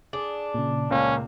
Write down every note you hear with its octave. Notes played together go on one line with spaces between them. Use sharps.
D4 G#4
A#2 C#3
C#2 A#3 C#4